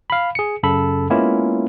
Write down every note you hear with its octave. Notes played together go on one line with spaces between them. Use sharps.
F5 B5
G#4 C#7
F#2 C#3 A4 B5
G#3 A#3 B3 C#4 E4 F4